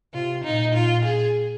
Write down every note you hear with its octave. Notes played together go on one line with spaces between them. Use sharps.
C3 F4
A#2 D#4
F4
G#4